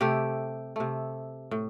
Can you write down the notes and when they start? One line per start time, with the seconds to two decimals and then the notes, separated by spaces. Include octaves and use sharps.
0.01 C3 A3 G4
0.76 C3 A3
1.51 A2